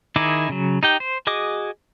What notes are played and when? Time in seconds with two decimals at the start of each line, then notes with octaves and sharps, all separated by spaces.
0.16 D#3 D#4 E4 G#4 D6
0.49 C#3 F#3
0.83 D#4 G4 G5
1.00 C5
1.27 F#4 G#4 D#5 D6 D#6